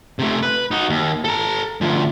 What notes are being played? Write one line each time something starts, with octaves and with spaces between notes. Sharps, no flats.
C3 A3
B4
D#4 F#4
D#2
A4 A#5
D2 F3